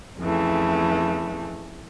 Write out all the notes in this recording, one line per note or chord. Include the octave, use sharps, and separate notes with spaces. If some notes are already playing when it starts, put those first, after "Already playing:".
F2 C#3 E3 A3